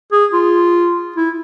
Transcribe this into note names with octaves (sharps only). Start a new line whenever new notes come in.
G#4
F4
E4